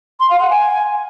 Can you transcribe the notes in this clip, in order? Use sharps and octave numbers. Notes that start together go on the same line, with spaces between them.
C6
F5
F#5
G#5